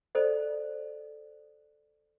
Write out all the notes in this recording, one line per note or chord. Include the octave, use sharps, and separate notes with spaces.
A4 C5 D5 D#5